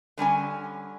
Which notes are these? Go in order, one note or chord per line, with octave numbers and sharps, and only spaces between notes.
D3 G3 C#4 G#5